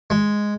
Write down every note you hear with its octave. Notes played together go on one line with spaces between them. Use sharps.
G#3